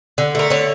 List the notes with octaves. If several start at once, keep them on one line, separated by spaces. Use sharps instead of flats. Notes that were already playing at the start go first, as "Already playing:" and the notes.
D3
A3 A#4
D3 C#5